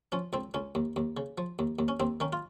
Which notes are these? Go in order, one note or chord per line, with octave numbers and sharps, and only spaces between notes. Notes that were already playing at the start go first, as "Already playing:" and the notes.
F3 C#4
C#2 C4
C#2 C#4
D#2
D#2
C#3
F3
D#2
D#2
C#4
D#2 C4
D#3 C#4
F4